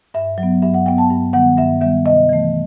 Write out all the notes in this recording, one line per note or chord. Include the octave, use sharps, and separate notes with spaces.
G2 E5
F#3
B3
G2 E5
F#5
F#3 B3 G5
A5
G2
D#3 G3 B3 F#5
G2 E5
D#3 G3 B3 E5
C3 D#5
E3 A3